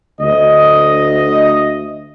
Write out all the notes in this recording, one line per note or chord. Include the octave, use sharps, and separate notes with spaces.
D2 D#5